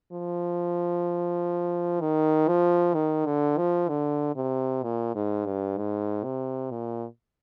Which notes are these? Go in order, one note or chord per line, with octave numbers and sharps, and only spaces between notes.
F3
D#3
F3
D#3
D3
F3
D3
C3
A#2
G#2
G2
G#2
C3
A#2